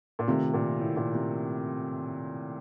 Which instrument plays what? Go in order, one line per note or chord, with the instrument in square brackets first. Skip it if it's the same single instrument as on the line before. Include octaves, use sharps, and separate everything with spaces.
[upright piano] A#2
[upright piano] C3 [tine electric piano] D#3 A3 C4 F4
[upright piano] A#2
A2
A#2
C3